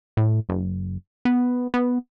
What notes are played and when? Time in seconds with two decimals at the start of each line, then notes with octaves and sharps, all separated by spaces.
0.17 A2
0.49 F#1
1.25 B3
1.74 B3